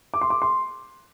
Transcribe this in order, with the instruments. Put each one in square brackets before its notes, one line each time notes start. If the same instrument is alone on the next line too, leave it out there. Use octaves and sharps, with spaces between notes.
[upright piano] D6
C6
D6
C6